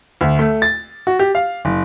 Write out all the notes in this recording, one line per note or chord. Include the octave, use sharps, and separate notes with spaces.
D2
A3
A6
F#4
G4
F5
F#1